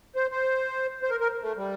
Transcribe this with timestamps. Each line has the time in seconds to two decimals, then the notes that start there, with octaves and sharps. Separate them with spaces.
0.16 C5
0.32 C5
1.03 C5
1.10 A#4
1.20 A#4
1.42 A3
1.57 G3